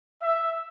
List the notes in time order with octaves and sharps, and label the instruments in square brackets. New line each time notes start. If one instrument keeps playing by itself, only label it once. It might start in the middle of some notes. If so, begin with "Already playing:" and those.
[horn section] E5